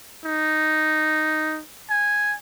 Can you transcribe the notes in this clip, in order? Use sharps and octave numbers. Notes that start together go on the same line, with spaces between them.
D#4
G#5